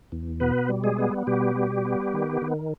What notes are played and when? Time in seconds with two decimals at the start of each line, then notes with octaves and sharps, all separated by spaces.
0.12 E2
0.40 B2 B3 B4
0.69 G3
0.84 G#3 G#4
0.98 B3
1.27 B2 G3 G4
1.56 G3
1.85 B3
2.14 D#3
2.42 D#3